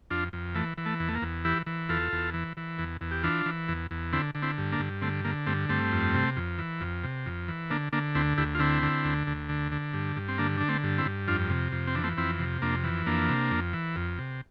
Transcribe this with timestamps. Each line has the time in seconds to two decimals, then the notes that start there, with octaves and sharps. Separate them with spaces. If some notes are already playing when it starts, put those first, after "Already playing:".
0.10 F2 D4 F4
0.33 F2
0.55 E3 A3
0.78 E3
0.85 A3
1.00 E2
1.08 A3
1.15 A#3
1.22 E2
1.45 E3 E4 G4
1.66 E3
1.89 E2 F4 A4
2.12 E2
2.34 E3
2.57 E3
2.79 E2
3.01 E2
3.11 G4
3.23 E3 D4 F4
3.46 E3
3.68 E2
3.91 E2
4.12 D3 C4 E4
4.35 D3
4.42 C4 E4
4.58 G2
4.72 A#3 D4
4.79 G2
5.02 D3 A3 C4
5.24 D3 A#3
5.47 G2 A3 C4
5.69 G2 A3 C4
5.92 F2
6.14 C3
6.36 F2
6.58 E3
6.81 F2
7.04 C3
7.26 F2
7.48 E3
7.70 D3 A#3 D4
7.93 D3 A#3 D4
8.15 D2 C4 E4
8.38 D2 E4 G4
8.55 F4
8.59 D3 C4 E4
8.83 D3
9.05 D2
9.27 D2
9.49 D3
9.72 D3
9.94 G2
10.16 G2
10.28 C4
10.38 D3 A#3 D4
10.57 D3 D4
10.68 A3 C4
10.84 G2
10.98 C4 E4
11.05 G2
11.28 F2 D4 F4
11.50 C3
11.72 F2
11.87 C4
11.95 E3 D4
12.04 A3 C4
12.17 F2 C4 E4
12.39 C3
12.62 F2 A#3 D4
12.84 E3
13.06 F2 A#3 D4
13.29 C3
13.51 F2
13.73 E3
13.96 F2
14.18 C3